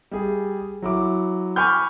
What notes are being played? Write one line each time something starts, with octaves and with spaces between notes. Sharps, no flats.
G3 G#4
F#3 E4 D6
G#5 B5 C#6 D6 F6 G6